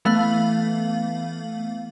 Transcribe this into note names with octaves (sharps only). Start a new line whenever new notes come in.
E3 A3 B3 F5 F#7